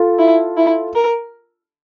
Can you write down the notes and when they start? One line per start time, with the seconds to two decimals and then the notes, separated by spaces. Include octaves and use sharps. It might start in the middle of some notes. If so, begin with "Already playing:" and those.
Already playing: F4 A4
0.19 E4
0.57 E4
0.95 A#4